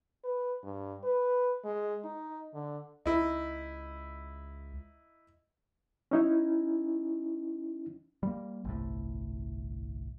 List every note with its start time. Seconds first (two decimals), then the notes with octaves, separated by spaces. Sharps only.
0.24 B4
0.64 G2
1.04 B4
1.64 G#3
2.04 D#4
2.54 D3
3.06 C#2 D#4 E4
6.11 C#4 D#4 E4
8.23 G3 A#3
8.64 G1 C2 A2